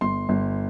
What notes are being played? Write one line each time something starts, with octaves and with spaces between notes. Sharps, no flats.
G1 C6
G1